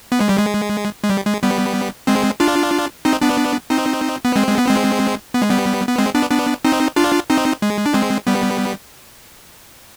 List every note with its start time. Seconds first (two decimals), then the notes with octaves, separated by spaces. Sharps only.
0.12 B3
0.20 G#3
0.29 G3
0.39 G#3
1.04 G#3
1.10 G3
1.26 G#3
1.43 G3 B3
2.07 G#3 C4
2.40 D4 F4
3.05 C4 D#4
3.21 B3 D4
3.70 C4 D#4
4.25 B3
4.36 G#3 C4
4.47 G#3
4.58 B3
4.68 G#3 C4
5.34 B3
5.42 G#3
5.50 G3 B3
5.88 B3
5.98 G#3 C4
6.15 B3 D4
6.31 B3 D4
6.65 C4 D#4
6.96 D4 F4
7.30 C4 D#4
7.62 G#3
7.86 D4
7.94 G#3 C4
8.27 G3 B3